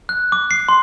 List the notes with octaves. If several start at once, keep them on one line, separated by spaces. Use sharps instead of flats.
F#6
D6
C7
C6